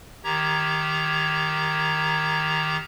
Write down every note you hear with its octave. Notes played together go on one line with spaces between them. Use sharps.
D#3 G4 A#5 G#6